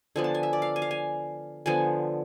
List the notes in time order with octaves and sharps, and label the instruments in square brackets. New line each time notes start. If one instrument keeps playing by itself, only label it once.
[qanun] D3 F3 B3 G#5
A5
G#5
E5
D5
F5
G#5
F5
G#5
D3 F3 B3 G#5